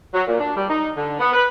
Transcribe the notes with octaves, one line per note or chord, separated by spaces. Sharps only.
F#3
A#2
D4
G3
D#4
D3
B3
B4